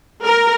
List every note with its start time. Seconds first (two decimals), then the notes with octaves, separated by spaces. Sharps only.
0.24 A#4